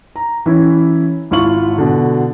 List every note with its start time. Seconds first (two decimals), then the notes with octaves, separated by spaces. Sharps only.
0.16 A#5
0.46 E3 C#4 E4
1.31 G#1 E4 F4 C#6 F#7
1.78 B2 D3